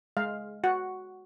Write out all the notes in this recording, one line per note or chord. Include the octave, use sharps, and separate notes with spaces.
G#3 F5
F#4 F#5